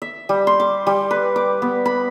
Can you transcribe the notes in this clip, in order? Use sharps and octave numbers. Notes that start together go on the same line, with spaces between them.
E5
G3
C6
D6
G3
B4
D6
B3
B5